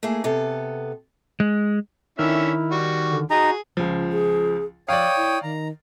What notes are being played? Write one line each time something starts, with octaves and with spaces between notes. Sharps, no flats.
A3 A#3 E4 G#4
C3 B3 A4
G#3
D3 D#3 C#4 D#4 E4 E5 F6
G3 F#4
D3
D#4 F#4 G#4 A#5
C#2 C#3 F3
G#4
F3 C#5 D5 F5 G5 D#6
E4
D#3 A#5